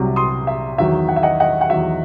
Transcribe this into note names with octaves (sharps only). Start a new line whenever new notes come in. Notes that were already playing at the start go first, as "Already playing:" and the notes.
Already playing: C2 C3 F#3
C6 D#6
E5
E2 D#3 F#3 E5
F#5
E5
D#5 F#5
D#5 F#5
F#5
E2 D#3 F#3 E5